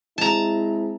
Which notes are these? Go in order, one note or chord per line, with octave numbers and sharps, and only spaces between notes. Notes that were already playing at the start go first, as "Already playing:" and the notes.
G#3 C4 E4 A5 A#5